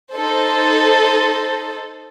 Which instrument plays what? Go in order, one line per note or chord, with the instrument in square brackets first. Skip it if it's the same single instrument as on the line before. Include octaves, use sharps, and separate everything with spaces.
[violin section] D#4 A4 C5